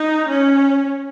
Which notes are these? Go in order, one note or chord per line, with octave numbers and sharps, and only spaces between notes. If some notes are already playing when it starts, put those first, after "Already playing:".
Already playing: D#4
C#4